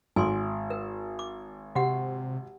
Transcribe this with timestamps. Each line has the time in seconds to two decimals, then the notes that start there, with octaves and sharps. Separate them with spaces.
0.16 G#1 G#5 C6 D6
0.70 A#4
1.19 D6
1.75 C3 F#4 G4 F#5